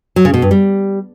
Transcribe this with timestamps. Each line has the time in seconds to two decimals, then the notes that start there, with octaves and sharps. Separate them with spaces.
0.16 F#3
0.25 C#3
0.34 B2
0.42 G2
0.51 G3